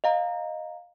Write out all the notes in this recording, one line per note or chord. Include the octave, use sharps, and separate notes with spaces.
D#5 F5 A#5